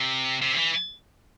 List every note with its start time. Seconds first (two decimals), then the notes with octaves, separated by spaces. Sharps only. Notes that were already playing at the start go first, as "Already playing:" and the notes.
Already playing: C3
0.42 C3
0.53 D3
0.57 E3